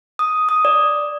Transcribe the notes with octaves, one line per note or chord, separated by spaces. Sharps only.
D#6
D#6
D5